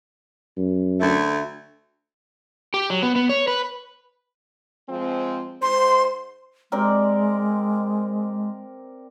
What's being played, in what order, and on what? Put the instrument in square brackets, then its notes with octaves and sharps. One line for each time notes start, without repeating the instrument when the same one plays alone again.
[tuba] F#2
[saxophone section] D2 A3
[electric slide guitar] G4
F#3
B3
B3
C#5
B4
[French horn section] F3 G#3 C4
[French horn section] G#2 C5 [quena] C6
[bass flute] G#3 [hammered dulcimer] C4 A#4 D5